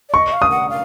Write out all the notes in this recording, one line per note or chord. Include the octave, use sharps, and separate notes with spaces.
D5
D#5 C#6
F5
D#6
F#5
F5